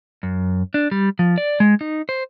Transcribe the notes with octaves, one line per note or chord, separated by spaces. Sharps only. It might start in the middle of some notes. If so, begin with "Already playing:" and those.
F#2
D4
G3
F3
D5
G#3
D#4
C5